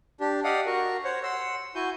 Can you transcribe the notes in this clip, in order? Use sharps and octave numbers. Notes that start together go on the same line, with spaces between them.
D4 G4
G4 D5 D#5 F5 F#5
F#4 A#4
C5 C#5 F#5
F#5 C6 E6
E4 F#4 G#5 G6